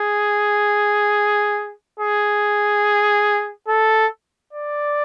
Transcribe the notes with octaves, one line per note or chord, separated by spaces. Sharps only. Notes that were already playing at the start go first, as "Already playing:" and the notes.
Already playing: G#4
G#4
A4
D5